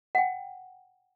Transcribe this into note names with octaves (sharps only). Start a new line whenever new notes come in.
F#5 G5